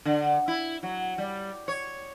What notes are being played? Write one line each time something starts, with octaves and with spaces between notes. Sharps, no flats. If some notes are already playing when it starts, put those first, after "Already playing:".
D3
E4
F#3
G3
C#5